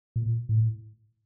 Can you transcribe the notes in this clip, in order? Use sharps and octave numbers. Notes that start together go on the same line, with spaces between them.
A#2
A2